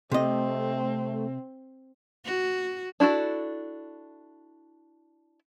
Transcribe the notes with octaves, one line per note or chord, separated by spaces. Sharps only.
C3 A3 C4 D#5
F#4
D4 E4 F#4 A4